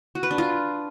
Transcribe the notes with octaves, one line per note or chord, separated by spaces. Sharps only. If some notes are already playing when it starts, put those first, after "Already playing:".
F#4
B4
D4
F4